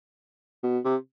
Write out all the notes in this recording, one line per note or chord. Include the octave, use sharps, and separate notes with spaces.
B2
C3